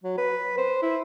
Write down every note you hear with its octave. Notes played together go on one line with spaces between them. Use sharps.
F#3
B4
C5
E4